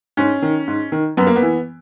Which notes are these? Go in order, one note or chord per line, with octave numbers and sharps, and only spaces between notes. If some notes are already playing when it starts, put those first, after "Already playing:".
G#2 C#4
D#3
G#2
D#3
F#2 B3
A#3
B3
E3